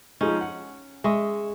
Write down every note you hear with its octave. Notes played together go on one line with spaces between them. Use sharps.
F3 G#3 C#4 D#4
F#5
G#3 E5 C#6 D#6